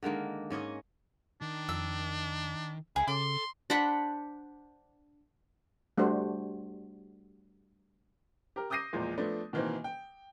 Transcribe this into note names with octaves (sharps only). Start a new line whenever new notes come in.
D3 D#3 G#3 A#3
G#2 C#4 C#5 D#5
D#3 D4
F2 E6
C#2 G#4 E5 B5
C#3 A4 C6 D6
D4 C5 F#5 B5
G3 A3 D4 F#4 C5
G4 A#4
D6 D#6 G6 A#6 C7 D#7
E2 A#2 F3 G#3
F3 A3 B3 D4
B2 D#3 E3 A#3 C4
G5